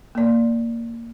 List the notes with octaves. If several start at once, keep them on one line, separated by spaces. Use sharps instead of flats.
A#3 D5